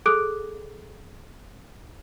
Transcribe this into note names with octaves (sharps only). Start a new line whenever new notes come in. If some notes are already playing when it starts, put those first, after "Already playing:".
G#4 A4 D6 D#6 F#6 D7